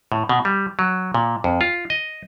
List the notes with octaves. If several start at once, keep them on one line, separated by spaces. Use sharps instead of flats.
A2
B2
G3
F#3
A#2
F2
F4
D#5